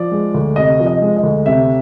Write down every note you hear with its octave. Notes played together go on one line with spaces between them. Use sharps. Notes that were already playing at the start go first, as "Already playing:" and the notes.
Already playing: F3 D5
G#3
D2
C3 D#5
F3
D#5
G#3
D#5
D2
C3 E5